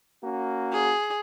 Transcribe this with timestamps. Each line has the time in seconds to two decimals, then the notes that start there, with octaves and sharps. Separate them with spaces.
0.24 A#3 C#4 F#4
0.72 G#4